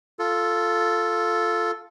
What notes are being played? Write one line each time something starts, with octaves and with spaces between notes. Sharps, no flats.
F4 A4